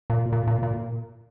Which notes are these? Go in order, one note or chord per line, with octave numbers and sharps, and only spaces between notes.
A#2
A#2
A#2
A#2